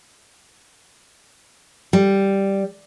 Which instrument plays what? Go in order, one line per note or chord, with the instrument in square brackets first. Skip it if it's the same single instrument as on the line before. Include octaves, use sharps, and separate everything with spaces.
[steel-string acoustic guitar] G3